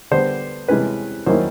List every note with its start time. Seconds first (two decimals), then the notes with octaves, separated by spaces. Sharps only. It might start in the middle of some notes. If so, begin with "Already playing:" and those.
0.11 D3 G3 B3 C5
0.68 C3 E3 G#3 C#4 B4
1.26 D#3 F#3 A#3 C#4 E4 C5